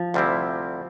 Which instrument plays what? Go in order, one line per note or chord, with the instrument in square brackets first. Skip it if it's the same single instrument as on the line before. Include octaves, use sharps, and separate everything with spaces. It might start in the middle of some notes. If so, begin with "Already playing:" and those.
Already playing: [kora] F3
[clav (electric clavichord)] D2 C3 G3 C4 E4